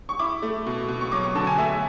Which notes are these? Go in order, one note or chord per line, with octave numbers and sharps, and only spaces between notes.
C#6
E4 D6
A3
B2
B2
C#6
F#3 D6
C#6
D3 A5
G#5
A3 E5